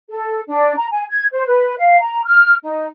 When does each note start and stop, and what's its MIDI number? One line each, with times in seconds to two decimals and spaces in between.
0.09 0.40 69
0.48 0.73 62
0.77 0.86 82
0.91 1.04 80
1.09 1.26 92
1.32 1.47 72
1.47 1.73 71
1.79 1.98 77
2.01 2.23 82
2.24 2.54 89
2.64 2.86 63